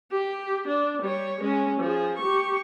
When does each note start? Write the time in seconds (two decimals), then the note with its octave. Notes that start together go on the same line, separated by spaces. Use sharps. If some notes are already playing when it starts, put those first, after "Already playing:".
0.12 G4
0.67 D4
1.02 G3 C#5
1.40 G#3 C#4
1.80 F3 G#4
2.17 G4 C#6